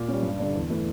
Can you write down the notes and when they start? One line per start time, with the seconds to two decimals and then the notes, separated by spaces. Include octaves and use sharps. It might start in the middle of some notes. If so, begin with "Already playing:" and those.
Already playing: A#2
0.08 G3 C#4
0.23 G2
0.39 D3 G3 D4
0.55 E2
0.70 E3 A3 E4